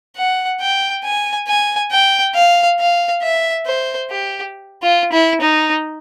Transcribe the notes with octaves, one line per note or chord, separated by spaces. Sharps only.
F#5
G5
G#5
G#5
G5
F5
F5
E5
C5
G4
F4
E4
D#4